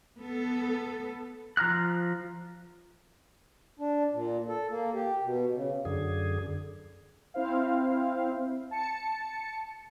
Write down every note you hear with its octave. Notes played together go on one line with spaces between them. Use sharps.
B3 A4
F3 A#5 F6 F#6
D4
A#2
A4
A#3
G4
B2
C#3
F#2 D3 G#4
C4 E4 C5 F5
A5 C#7